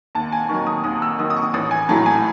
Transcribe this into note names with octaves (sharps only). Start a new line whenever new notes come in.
D#2 A5
G#5
D#3 F#3 C#6
D#6
D#2 D#6
E6
D#3 F#3 D#6
D#6
C#6
A1 D#6
G#5
A2 F#3 A5
G#5